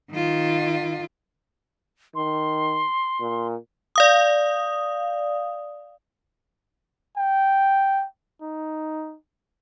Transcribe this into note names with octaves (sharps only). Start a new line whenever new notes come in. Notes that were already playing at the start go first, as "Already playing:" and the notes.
D#3 F4
D#3 C6
A#2
D5 F5 D#6
G5
D#4